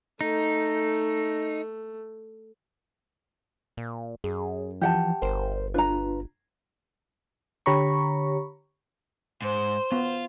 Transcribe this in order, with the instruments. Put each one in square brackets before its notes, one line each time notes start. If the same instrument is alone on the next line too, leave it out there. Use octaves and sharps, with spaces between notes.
[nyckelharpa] A3 [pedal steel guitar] D#4
[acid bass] A#2
[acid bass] F#2 [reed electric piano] G#4
[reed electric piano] E3 F3 [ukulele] G4 F#5 A5
[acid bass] G1 [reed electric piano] A#4 C5
[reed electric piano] D4 F4 [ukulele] B4 A#5
[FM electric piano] D3 G4 C#5 A#5 B5 C#6
[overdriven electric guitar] G#2 [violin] C5
[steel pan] B3 [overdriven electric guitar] F4